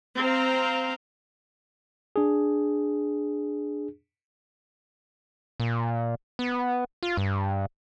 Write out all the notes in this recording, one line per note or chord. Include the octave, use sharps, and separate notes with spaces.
C4 F5 A#5
D4 G#4
A#2
B3
F4
G2